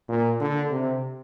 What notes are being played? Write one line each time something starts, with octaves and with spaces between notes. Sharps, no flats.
A#2
D3
C3